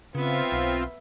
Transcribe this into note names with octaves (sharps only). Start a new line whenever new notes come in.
C#3 B3 C4 F4 E5
B1